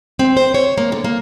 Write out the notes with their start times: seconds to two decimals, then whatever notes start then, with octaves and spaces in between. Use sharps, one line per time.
0.19 C4
0.37 C5
0.54 C#5
0.78 A#3
0.92 D3
1.04 A#3